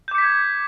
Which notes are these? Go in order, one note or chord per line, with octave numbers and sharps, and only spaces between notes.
D6 G6 G#6 B6 C#7